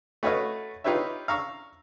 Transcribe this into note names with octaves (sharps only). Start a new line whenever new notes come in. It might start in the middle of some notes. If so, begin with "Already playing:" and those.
A3 F#4 B4 C#5 D#5 F5
D#4 F4 G4 B4 C#5 E5
F5 A#5 C#6 E6